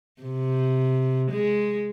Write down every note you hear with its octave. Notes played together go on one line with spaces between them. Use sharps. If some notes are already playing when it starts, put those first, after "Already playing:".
C3
G#3